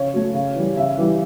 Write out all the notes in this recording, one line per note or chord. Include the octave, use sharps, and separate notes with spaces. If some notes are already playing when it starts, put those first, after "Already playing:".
Already playing: C#3 C#5
F#3 A3
C#3
E3 G3
C#3 E5
E3 G3